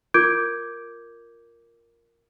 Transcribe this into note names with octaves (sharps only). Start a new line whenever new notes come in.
F4 A#4 D6 G6 G#6 D7